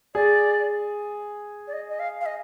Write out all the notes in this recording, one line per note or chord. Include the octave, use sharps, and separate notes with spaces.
G#4 D5
D5
D#5
D#5
F5
F5
D#5